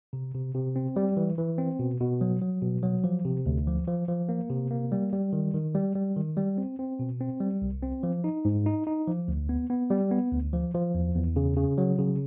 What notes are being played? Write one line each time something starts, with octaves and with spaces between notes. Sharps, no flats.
C3
C3
C3
C4
G3
E3
E3
C4
B2
B2
F#3
F#3
B2
F#3
F3
C3
D2
F3
F3
F3
A#3
C3
A#3
G3
G3
D#3
D#3
G3
G3
D#3
G3
C4
C4
B2
C4
G3
C2
C4
F3
D#4
G#2
D#4
D#4
F3
D2
B3
B3
G3
B3
D2
F3
F3
E2
E2
C#3
C#3
F#3
C#3